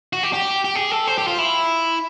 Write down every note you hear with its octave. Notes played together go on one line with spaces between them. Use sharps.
F#4
G4
G4
G4
G#4
A4
C5
G4
F4
E4